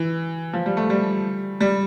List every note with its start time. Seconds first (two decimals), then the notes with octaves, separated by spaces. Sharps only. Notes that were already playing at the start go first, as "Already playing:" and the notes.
Already playing: E3
0.53 F3
0.66 G3
0.77 A3
0.90 G3
1.60 G3